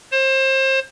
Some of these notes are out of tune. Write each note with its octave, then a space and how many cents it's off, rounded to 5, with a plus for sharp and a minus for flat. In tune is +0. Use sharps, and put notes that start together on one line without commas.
C5 +30